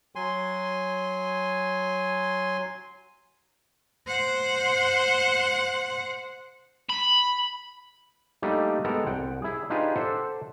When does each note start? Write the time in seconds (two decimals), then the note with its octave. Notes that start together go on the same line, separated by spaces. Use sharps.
0.16 F#3 G#5 C6
4.07 C5 F#5
6.90 B5
8.42 G3 A3 A#3 D4 D#4 G4
8.84 G#3 B3 A4 A#4 G5
9.06 C2 F#5 G5
9.42 E4 G#4
9.70 D4 D#4 F4 G4 G#4 B4
9.96 A4 C5 D5 E5 F#5